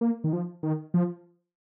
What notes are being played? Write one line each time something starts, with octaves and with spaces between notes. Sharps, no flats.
A#3
D#3
F3
D#3
F3